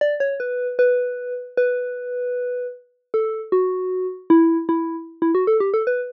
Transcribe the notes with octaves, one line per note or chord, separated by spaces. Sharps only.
D5
C#5
B4
B4
B4
A4
F#4
E4
E4
E4
F#4
A4
G4
A4
B4